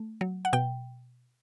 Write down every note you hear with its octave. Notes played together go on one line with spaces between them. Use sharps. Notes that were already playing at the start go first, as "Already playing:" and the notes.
Already playing: A3
F#3
F#5
B2 G5